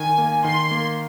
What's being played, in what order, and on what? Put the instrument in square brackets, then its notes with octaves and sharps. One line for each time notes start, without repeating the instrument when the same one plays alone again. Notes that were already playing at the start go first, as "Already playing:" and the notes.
Already playing: [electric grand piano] D#3 [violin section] G#5
[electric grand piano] A#3
[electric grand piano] D#3 [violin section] C6
[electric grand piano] A#3